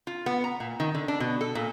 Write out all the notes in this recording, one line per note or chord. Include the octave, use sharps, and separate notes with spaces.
F4
B3
A#5
A#2
D#3
D3
D4
B2
A4
A#2